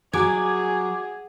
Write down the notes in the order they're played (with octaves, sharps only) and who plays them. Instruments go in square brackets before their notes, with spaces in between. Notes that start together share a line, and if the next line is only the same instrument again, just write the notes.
[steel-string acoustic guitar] F#3 [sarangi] G#4 [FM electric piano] G#5 D6 G#6